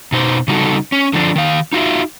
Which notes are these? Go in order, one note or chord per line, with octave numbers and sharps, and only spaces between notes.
B2 D#4 C5
C#3 G3 D#4 F#4 A4
C#4
D3 F3 D4
D#3 F5
D#4 F4 F#4 E5